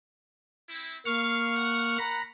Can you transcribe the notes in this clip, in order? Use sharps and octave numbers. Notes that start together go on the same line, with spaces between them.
C4 E4
A#3 F5 C#6 F6
F#5
A#5 B5